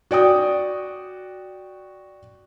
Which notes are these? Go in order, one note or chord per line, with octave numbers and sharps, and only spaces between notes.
F#4 D5 G5 D#6